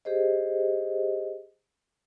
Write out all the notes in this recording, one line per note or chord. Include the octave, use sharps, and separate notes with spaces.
G4 G#4 C5 D#5